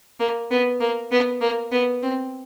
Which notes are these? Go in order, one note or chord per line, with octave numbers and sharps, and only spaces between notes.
A#3
B3
A#3
B3
A#3
B3
C4